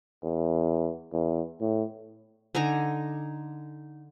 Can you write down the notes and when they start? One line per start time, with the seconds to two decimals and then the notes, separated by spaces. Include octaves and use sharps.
0.23 E2
1.13 E2
1.61 A2
2.55 D3 D#4 G#5 A#5